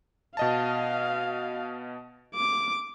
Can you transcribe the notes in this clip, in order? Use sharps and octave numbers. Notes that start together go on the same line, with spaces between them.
B2 D#5 F5 A5
D6